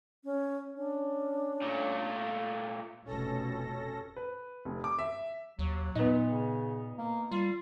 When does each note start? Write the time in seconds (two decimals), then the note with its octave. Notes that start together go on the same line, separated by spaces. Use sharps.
0.24 C#4
0.77 C#4 D4
1.62 A#2 A3
3.05 F1 B2 C#4 A4 A#6
4.16 B4
4.65 F1
4.84 D6
4.99 E5
5.59 D#2 F#3
5.95 A#2 B3 D#4
6.30 C#3
6.98 A#3
7.32 G3 F4